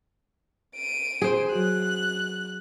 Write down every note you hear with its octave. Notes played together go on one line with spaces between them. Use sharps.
D7 D#7
G#4 C5
F#3 F#4 F#6